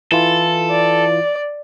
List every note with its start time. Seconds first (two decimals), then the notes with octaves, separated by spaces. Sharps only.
0.12 E3 E4 F4 A4
0.71 D5